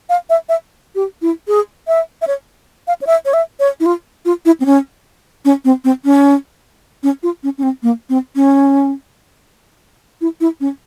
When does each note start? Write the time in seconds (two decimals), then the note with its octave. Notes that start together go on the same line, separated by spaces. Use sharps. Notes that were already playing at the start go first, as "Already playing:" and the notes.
0.09 F5
0.30 E5
0.49 E5
0.95 G4
1.22 E4
1.48 G#4
1.88 E5
2.22 E5
2.27 C#5
2.87 F5
3.01 C#5
3.07 E5
3.25 C#5
3.33 E5
3.60 C#5
3.80 E4
3.86 F4
4.25 F4
4.45 E4
4.60 C4
4.66 C#4
5.45 C#4
5.65 C4
5.84 C4
6.05 C#4
7.03 C#4
7.23 F4
7.43 C#4
7.58 C#4
7.63 C4
7.83 A#3
8.09 C4
8.36 C#4
10.21 E4
10.41 E4
10.60 C#4